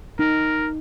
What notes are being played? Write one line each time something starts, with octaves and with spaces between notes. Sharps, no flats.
D#4 A#4